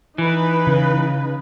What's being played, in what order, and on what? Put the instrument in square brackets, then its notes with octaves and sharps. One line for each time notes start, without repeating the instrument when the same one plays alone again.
[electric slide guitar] E3 [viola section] D#4 B4
[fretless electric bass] C#3